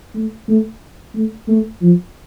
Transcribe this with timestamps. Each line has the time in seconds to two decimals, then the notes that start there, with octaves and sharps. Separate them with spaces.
0.15 A3
0.48 A3
1.14 A3
1.48 A3
1.81 F3